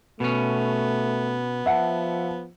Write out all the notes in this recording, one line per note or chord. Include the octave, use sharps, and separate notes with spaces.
B2 A3 B3 C#4
F3 E5 F#5 A5